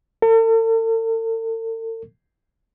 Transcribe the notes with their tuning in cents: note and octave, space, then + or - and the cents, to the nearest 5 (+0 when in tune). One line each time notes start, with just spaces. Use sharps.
A4 +45